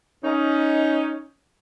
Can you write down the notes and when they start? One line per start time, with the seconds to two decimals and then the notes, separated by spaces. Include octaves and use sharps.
0.24 C#4 D#4